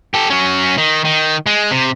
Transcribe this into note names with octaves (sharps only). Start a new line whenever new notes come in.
G4 A4
F#3 C#4
D#3
D#3
G#3
C3